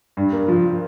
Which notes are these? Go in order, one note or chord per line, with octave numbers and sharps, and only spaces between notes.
G2
A#3
F3